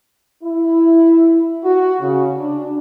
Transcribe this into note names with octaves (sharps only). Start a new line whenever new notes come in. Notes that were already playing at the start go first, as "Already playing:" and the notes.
E4
F#4
C#3
D4